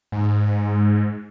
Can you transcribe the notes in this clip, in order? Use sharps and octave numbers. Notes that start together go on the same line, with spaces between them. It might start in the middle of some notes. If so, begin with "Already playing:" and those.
G#2